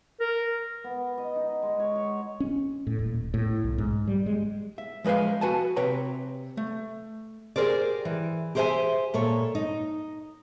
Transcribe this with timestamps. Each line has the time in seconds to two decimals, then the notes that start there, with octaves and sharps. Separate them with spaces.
0.20 A#4
0.84 B3
1.18 D#5
1.36 D#4
1.62 G#3
1.79 C#5
1.96 C#5
2.40 C#4
2.87 A2
2.99 D#1
3.34 A2
3.64 B1
3.78 G#2
4.08 G3
4.26 G#3
4.78 E5
5.04 F3 G#3 B4 C5 F5
5.41 F#4 B4 G#5 A5
5.76 C3 B4 C#5 G5 A#5
6.57 A3
7.56 G4 G#4 A#4 C5 D5
8.05 E3
8.55 G4 G#4 C5 D#5 E5 G#5
9.14 A#2 A4 C#5
9.55 D#4